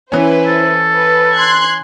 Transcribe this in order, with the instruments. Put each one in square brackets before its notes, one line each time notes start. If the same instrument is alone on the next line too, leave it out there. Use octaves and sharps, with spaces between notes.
[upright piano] E3 C#4 [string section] E4 B4 C5
[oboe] A4
[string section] B4
C6 F#6 G#6